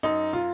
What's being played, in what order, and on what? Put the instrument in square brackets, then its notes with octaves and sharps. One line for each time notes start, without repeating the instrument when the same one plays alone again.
[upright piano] F#2 D#4
F4